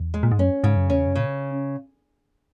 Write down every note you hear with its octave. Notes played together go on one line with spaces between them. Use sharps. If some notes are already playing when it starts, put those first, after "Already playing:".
Already playing: E2
G#3
A#2
G#2
F#2 C#4
G#2 C#3
F#2
E2 C#4
F#2
A#2 C#3